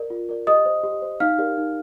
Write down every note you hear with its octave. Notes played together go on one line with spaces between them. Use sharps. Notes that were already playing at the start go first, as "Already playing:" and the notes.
Already playing: A#4 D5
F4
A#4 D5
G4 D#5 D#6
C5
G4
C5
D#4 F5 F6
G4 A#4 D5
D#4